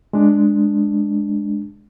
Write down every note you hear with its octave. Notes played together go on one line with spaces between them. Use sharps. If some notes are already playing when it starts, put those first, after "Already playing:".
G#3 D4